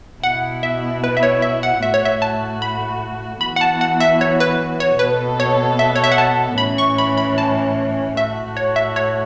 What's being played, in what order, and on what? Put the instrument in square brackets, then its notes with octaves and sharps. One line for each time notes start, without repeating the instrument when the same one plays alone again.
[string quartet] B2 B3 E4 [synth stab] F#5
[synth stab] E5
B4
E5
C#5
E5
F#5
[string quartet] A2 A3 F#4 [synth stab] E5
[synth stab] C#5
E5
A5
B5
[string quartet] E3 B3 F#4 [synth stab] B5
[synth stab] F#5
A5
F#5
E5
C#5
B4
C#5
[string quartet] B2 B3 A4 [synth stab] B4
[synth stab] C#5
E5
C#5
E5
F#5
A5
[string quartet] A2 E3 C#4 [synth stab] B5
[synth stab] C#6
B5
B5
A5
[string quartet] A2 A3 F#4 [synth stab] E5
[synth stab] C#5
E5
C#5